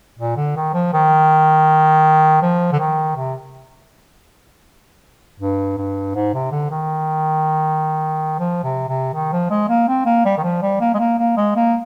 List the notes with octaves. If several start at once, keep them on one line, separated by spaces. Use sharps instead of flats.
A#2
D3
D#3
F3
D#3
F3
D3
D#3
C3
G2
G2
G#2
C3
D3
D#3
F3
C3
C3
D#3
F3
G#3
A#3
C4
A#3
G3
D#3
F3
G3
A#3
G#3
A#3
A#3
G#3
A#3